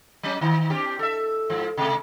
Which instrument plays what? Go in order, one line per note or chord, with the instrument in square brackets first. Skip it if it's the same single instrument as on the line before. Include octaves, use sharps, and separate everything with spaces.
[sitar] F#3 C#4
D#3
C4 D4 G4
A4 E5
G#2 F3
C3 A3